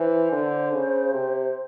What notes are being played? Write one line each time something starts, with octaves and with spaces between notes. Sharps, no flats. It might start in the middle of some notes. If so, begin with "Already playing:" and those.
Already playing: E3 C5
D3
C#3
C3